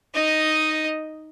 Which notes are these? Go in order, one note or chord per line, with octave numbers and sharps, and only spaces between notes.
D#4 D#5